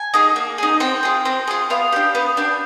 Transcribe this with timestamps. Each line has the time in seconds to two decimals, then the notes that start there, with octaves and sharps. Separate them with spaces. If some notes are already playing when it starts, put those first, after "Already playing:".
Already playing: G#5
0.14 D#4 G#4
0.36 A#3
0.58 D#4 G#4
0.80 C4 G5
1.03 F4 G#4
1.25 C4
1.47 F4 G#4
1.70 B3 F5
1.93 D4 G4
2.15 B3
2.37 D4 G4